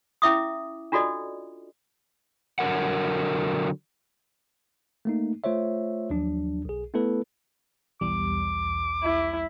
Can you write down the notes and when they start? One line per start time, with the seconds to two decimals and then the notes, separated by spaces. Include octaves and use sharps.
0.22 C#4 E4 E5 D6 D#6
0.92 D4 F4 F#4 A4 D5 D#5
2.59 D3 F#3 A#4 F#5
5.05 A3 A#3 D#4
5.44 A3 F4 C5 C#5 E5
6.10 D#2 F3 F#3 D4
6.65 B1 G#4
6.94 A3 B3 E4 A4 B4
8.01 B1 E2 G3 D6
9.03 E4